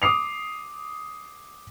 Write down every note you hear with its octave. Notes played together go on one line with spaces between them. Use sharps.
D6 D#6 C7 F7